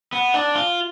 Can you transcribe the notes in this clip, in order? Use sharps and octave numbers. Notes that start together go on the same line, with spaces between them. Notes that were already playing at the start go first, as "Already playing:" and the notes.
B3
D4
F4